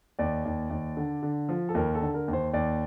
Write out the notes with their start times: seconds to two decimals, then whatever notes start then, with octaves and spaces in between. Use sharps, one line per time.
0.19 D#2 D5
0.45 D#2
0.70 D#2
0.97 D3
1.23 D3
1.49 F3
1.69 A4
1.75 D#2 A#4
1.95 A4
2.01 D3
2.14 A#4
2.28 D#2
2.33 C5
2.53 D#2 D5